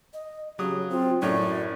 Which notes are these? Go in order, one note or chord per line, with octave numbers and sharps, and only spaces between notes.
D#5
C#3 F#3 G4 D#6
C4 F4
F#2 A2 F#3 C#4 D5